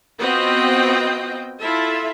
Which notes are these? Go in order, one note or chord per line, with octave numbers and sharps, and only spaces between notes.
B3 C4 F4 F#4 D#5 G5
E4 F4 A4 E5